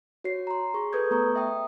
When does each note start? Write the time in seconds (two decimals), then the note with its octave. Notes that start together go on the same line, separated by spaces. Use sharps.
0.24 F#4 C#5 C7
0.47 A#5 C6
0.74 G#4 C#6
0.93 A4 B4 D#6 G6 G#6
1.11 A3 B3 A#5 C#6
1.35 E5 G5 D#6